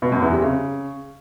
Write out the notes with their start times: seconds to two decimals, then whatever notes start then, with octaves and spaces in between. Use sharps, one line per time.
0.02 B2
0.12 F#2
0.22 E2
0.32 C3
0.42 C#3